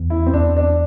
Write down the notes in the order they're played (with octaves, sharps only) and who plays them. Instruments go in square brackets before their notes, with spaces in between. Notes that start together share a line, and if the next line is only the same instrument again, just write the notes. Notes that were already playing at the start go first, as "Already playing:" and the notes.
Already playing: [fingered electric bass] E2
[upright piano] E4
C4
[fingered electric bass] E2 [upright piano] D4
[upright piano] D4